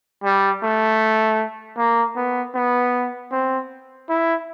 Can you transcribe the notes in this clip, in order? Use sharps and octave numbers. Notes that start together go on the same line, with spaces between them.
G3
A3
A#3
B3
B3
C4
E4